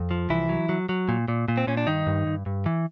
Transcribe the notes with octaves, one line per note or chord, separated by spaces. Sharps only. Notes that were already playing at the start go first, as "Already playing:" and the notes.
Already playing: F2
F3
C2 E3 E4
F#3
F#3
F#3
A#2
A#2
A#2
C4
A#2 C#4
D4
G2 D#3 D#4
G2
G2
G2
E3